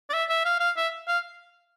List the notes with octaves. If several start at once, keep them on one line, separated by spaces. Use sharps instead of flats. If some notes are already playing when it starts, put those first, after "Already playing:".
D5
E5
E5
F5
F5
E5
F5